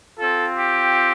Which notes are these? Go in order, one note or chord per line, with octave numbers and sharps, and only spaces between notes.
C4 F4 A4
G4